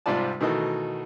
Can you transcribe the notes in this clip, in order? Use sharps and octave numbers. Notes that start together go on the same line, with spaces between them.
G#2 C3 G3 F4 D5 A5
B2 D#3 E3 A3 D#4 F#4